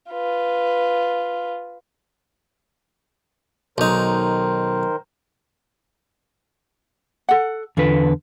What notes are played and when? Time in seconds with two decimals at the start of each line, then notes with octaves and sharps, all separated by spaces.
0.10 F4 B4
3.78 B1 D#3 D#4 A#4 C5
7.29 A4 F#5
7.77 E2 D3 F4 A4 B4